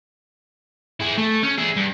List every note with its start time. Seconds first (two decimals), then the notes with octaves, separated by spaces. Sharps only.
1.00 E4 G#4
1.17 A3
1.43 C#4
1.58 G#4 E5
1.76 G2